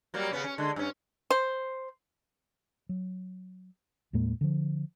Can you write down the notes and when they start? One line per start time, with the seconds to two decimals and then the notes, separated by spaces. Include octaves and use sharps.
0.14 F#3 G3 A#3
0.31 C#3 B3 C#4
0.44 C#4
0.58 D3 G#3
0.76 G2 C#4
1.30 C5
2.89 F#3
4.13 D#2 A2 G#3 A#3
4.41 D3 F3